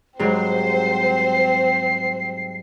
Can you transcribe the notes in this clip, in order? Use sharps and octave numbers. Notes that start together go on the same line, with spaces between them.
G#2 F#3 G3 C4 C5 C7